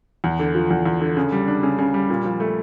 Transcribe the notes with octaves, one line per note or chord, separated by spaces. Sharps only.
E2
D3
F3
E2
E2
D3
C#3
G3
D4
C#3
C#3
G3
A#2
F3
A3